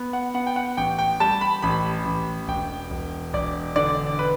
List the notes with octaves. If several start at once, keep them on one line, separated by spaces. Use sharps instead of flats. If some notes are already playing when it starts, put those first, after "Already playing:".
Already playing: B3
F#5
B3 F#5
G5
F#5
A1 G5
G5
G3 A5
B5
A1 B5
A1
E1 G5
E1
E1 D5
D3 D5
B4